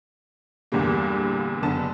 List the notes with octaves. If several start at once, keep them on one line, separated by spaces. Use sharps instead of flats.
E2 G2 A#2 D3 G3 A#3
F#1 D3 B3 A5